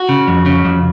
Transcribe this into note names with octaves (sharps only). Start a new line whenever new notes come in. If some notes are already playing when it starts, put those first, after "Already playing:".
Already playing: F#4
C#3
F2
C#3
F2